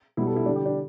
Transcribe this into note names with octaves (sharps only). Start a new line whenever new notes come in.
B2 G3 E4
A4
E4
D3 G3 D4
G4
D4